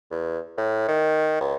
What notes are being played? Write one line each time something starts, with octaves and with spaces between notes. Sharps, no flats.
E2
A2
D#3
C#2